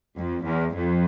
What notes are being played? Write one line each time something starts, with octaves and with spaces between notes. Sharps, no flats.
F2
E2
F2